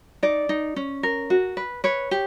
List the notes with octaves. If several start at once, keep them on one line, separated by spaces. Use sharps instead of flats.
D#4 D5
D#4
C#4
A#4
F#4
B4
B4 C#5
G4